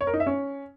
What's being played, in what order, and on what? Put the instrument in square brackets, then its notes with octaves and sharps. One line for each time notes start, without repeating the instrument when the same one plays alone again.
[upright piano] C#5
A#4
D#4
E5
C#4